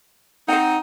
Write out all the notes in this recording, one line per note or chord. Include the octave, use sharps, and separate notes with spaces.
C4 D#4 C5 F#5